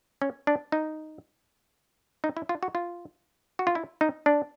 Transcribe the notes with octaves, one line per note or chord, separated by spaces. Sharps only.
C#4
D4
D#4
D#4
E4
F4
F#4
F4
F#4
F4
E4
D#4
D4